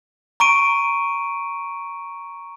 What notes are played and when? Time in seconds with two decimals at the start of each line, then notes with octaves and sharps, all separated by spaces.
0.40 A#5 C#6 D7 D#7